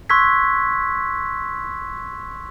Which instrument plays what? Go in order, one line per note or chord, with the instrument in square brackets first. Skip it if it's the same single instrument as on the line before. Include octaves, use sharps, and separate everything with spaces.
[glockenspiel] C6 C#6 E6 F#6 G#6 B6